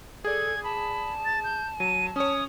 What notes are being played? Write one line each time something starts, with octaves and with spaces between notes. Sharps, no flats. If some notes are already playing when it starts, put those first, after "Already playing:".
G#4 A4 D5 G#6
A5 B5
A6
G6
F#3 D#7
C#4 C#5 D#6